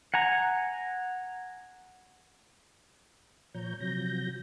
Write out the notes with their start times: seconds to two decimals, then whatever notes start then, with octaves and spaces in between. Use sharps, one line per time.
0.14 F#5 G#5 A#5
3.54 A#2 F3 C#5 A#5 G6
3.80 C3 F3 F#3 G6 A#6